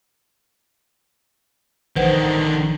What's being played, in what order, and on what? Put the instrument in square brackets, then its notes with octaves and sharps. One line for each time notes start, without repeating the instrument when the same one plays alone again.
[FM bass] A#1 [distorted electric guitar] D3 D#3 [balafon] B4 C5 F#5